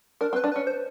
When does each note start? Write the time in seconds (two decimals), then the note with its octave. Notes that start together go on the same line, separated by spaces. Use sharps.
0.21 D4 A#4
0.33 C4
0.36 B4
0.44 D4
0.52 C#4 B4
0.67 C5